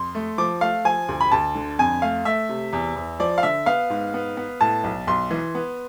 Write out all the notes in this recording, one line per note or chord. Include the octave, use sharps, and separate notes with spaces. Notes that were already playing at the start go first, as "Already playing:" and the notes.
Already playing: F2 C6
A3
F3 D6
A3 F5
F3 G#5
D2
B5
D2 A5
D3
F2 G#5
A3 F5
A3 E5
C3
E2
E2
F3 D5
F5
D3 E5
B3 F5
G#2
B3
B3
A2 A5
B1
B1 C6
E3
B3